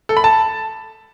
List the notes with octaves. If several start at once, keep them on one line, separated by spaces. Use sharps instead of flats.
A4
B5
A5